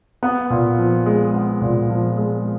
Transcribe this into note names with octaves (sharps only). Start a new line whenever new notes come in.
B3
A#2
F3
G#3
B3
A#2
F3
G#3